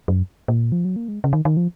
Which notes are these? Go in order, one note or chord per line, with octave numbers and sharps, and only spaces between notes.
F#2
A#2
F3
F#3
A#3
G#3
C#3
D#3
D#3
F3